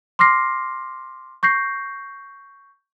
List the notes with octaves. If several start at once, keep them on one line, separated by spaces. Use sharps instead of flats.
C6 D6 F6 A#6 C7
C#6 G6 A#6 C7